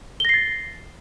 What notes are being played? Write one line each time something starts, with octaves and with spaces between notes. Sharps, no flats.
A6 A#6 C7 G7